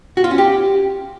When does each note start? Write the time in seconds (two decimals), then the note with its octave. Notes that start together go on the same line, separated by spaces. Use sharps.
0.17 F#4
0.24 F4
0.31 C#4
0.38 G4